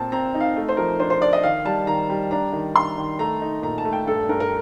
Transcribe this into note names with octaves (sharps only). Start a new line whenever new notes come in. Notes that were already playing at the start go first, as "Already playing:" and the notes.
Already playing: A#2 C4 A5
C4 A#5
D#4
F5
A3
C5
F3 A#4
D4 C5
C5
D4 D5
D#5
D#3 F5
G3 A5
D#3 A#5
G3
D4 A#5
D#3
D4 C6
D#3
A3 A#5
D#4
A#2 A#5
A5
A3
G5
G2 A4
G2 A#4
A#4